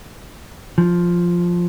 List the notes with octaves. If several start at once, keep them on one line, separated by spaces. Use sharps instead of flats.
F3